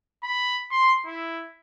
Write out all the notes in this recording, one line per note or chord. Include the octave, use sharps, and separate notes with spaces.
B5
C6
E4